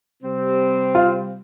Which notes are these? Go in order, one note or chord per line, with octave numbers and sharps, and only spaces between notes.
C3 G3 C4
F4